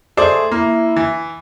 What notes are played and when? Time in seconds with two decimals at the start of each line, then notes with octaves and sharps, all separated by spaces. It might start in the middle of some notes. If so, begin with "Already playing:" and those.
0.17 A3 G#4 C5 D5
0.51 A#3 E4
0.96 E3